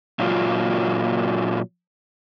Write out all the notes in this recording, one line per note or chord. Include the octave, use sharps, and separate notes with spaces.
A#2 F#3 F4